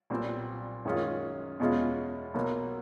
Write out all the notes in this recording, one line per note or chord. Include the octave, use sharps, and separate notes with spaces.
B1 A#2 G3 C4
F#2 D#3 G#3 C#4 F4
E2 B2 G#3 C#4 F4
B1 B2 F#3 A#3